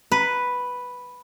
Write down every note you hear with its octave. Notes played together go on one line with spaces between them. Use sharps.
B4